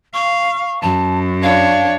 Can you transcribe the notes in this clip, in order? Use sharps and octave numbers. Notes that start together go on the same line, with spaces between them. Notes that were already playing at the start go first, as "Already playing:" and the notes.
F5 C#6
F#2 A5
D4 C#5 F5